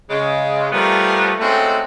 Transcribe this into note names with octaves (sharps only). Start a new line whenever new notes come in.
C#3 G#3
F3 G3 A3 B3 A#4
G#3 A3 C4 C#4 D#4 F#4